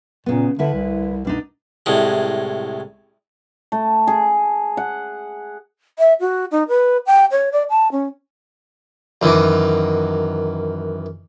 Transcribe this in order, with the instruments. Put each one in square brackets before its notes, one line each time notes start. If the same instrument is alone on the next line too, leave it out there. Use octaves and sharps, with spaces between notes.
[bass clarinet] A#2 [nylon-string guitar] C#3 B3
[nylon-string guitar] D2 E4 B4 [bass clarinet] D3
[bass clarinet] C2
[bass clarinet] C2 [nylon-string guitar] B2 D4 D#4
[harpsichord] C2 A2 G#3
[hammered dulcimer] A3
G#4
F#5
[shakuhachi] E5
F#4
D#4
B4
G5
C#5
D5
A5
C#4
[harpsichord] F#2 D#3 E3 D6